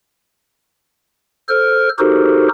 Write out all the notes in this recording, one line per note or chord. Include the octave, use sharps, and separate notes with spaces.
A4 C5 F6
D#4 F#4 G4 A4 A#4 C5